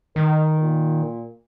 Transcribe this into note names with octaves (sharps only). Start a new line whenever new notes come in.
D#3 A#4
A#2